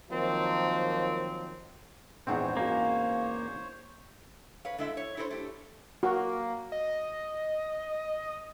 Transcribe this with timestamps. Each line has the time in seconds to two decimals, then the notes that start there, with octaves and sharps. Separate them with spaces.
0.10 D#3 F3 F#3 A#3 C4
2.27 A#1 E2 G#2 C4 C5 C#5 F#5
2.57 A#3 C#4 F#4
4.65 B4 C#5 F5
4.78 D3 G#3 E4 A4 E5
4.97 C#5
5.17 E4 A4 A#4 C5 C#5
5.30 A3 G4
6.03 A#3 F#4
6.72 D#5